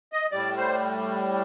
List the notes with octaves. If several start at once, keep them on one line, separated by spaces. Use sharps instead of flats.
D#5
A2 G3 D5
C5